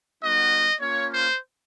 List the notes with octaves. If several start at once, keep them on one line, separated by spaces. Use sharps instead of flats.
G3 B3 D#4 F#4 D#5
A#3 C#4 F4 C#5
C5